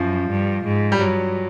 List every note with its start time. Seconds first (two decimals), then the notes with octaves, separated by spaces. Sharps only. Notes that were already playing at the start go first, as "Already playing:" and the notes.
Already playing: F#2 F3
0.30 G2
0.65 G#2
0.92 G3
0.99 G2 F#3